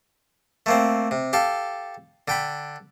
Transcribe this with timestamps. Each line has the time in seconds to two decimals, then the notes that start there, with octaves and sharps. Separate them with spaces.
0.66 A3 A#3 C4
1.11 C3
1.33 G4 A4 F5
2.28 D3 G5 B5